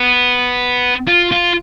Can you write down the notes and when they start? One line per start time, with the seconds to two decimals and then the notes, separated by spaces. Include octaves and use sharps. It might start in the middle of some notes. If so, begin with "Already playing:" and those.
Already playing: B3
1.07 F4
1.32 F4